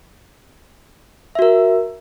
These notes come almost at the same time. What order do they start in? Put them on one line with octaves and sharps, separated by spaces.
E5 F#4 A#4